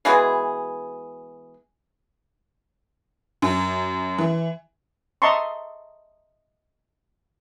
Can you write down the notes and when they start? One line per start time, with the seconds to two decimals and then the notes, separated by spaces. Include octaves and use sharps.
0.05 B2 E3 G#3 G#4
3.42 F#2
4.18 E3
5.22 D#5 E5 A5 A#5 C6 C#6